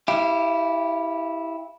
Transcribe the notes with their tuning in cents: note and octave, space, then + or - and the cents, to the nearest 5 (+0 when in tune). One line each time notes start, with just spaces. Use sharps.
E4 -10 G4 +0 F5 -40